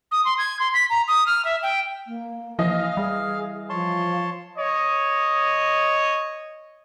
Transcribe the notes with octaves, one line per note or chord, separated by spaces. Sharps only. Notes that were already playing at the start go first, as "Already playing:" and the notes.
D#6
C6
G#6
C6
B6
A#5
D#6
F6
E5
G5
A#3
E3 F3 D#5 F5 F6
G3 G#4
F3 C#5 A5 C6
C#5 D#5